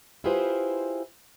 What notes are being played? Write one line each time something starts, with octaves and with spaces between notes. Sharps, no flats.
E4 F4 G4 G#4 B4 C5